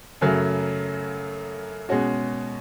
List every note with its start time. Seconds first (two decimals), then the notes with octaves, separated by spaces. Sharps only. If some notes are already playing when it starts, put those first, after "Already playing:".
0.21 F#2 C#3 F#3 A3
1.89 B2 G#3 C#4 F#4